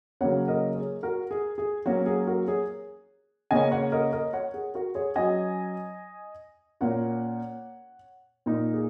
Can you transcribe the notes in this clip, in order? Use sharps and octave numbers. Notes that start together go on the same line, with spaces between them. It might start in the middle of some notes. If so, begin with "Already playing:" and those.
C#3 F#3 A#3 C#4 C#5 F#5
A#4 D#5
G#4 C#5
F#4 A#4
G#4
G#4
F#3 A#3 C#4 F#4
G#4
F#4 A#4
G#4 C#5
C#3 A#3 C#4 D#5 G#5
C#5 F#5
A#4 D#5
A#4 D#5
C#5 F#5
G#4
F#4 A#4
G#4 C#5
F#3 C#4 D#5 G#5
A#2 A#3 C#4 C#5 F#5
A#2 A#3 D#4
G#4